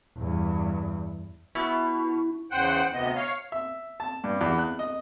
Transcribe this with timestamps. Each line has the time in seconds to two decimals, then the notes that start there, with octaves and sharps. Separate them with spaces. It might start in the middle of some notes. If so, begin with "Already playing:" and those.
0.18 E2 G2
1.55 B2 E4
2.51 E2 C#3 C5 F#5 G5 F#6
2.94 D2 C3 B3 D#5
3.15 C#5 F5
3.52 E5
4.00 A5
4.24 G2
4.41 E2
4.58 F#6
4.79 D#5